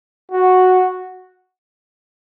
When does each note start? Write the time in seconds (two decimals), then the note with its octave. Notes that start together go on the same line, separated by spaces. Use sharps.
0.31 F#4